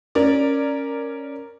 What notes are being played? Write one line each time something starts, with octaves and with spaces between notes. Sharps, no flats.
C#4 A#4 D5